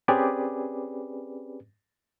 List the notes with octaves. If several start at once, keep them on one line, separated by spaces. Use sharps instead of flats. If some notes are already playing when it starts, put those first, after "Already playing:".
C4 C#4 G4 G#4 B4 D5